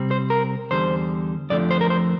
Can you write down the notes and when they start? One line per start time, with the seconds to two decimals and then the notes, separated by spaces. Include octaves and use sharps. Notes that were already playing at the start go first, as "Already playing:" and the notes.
Already playing: C3 G3 C4
0.11 C5
0.30 A#4
0.71 E2 D3 G3 C5
1.50 F2 D3 F3 A3 D5
1.71 C5
1.81 A#4
1.90 C5